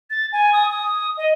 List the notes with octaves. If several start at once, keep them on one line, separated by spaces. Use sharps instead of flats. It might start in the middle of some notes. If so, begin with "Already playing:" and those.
A6
G#5
D#6
D#6
D#5